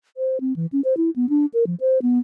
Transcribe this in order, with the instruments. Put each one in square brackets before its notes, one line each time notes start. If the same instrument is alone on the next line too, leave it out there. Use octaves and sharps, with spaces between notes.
[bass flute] C5
C4
E3
C#4
C5
E4
B3
D4
A#4
F3
C5
B3